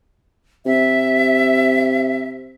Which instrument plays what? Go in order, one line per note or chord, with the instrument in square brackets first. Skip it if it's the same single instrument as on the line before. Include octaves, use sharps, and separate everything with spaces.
[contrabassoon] C3 [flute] E5